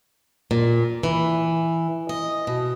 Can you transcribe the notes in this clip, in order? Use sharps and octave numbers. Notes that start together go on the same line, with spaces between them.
A#2
E3
D#5
B2